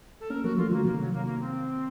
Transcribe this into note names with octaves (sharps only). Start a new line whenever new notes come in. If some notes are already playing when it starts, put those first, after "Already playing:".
A4
A#3 C#4 A#4
F#3 A#3 F#4
F3 A3 F4
D#3 F#3 A#3
C3 D#3 A#3
F#3
A#3
A#3
C4